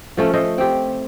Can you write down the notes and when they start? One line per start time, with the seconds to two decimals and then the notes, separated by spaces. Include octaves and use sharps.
0.17 F3 A3 C#4
0.33 A3 A4 C5 D#5
0.58 C4 G4